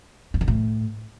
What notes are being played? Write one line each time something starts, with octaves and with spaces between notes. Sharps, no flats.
G2
D3
A2